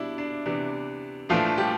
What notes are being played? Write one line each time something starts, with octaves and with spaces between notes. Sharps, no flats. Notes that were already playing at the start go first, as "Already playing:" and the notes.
Already playing: B2 G3 D4 E4
D4
C3 E3 B3 D4
A2 E3 F3 A3 D4 F4
G3 G4